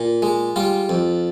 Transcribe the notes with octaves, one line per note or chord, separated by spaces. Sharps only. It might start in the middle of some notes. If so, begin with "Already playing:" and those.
Already playing: A#2
G#3
G3 F4
F2